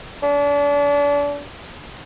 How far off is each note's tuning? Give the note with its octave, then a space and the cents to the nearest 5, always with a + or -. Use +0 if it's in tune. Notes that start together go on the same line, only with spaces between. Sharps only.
D4 -35